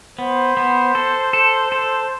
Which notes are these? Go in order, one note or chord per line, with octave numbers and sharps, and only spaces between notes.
B3 C5
B3
A4
A4
A4